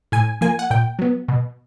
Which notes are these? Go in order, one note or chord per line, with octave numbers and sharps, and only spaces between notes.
A2 G#5
F3 A#3 G#5
F#5
A#2 G5
F#3 B3
B2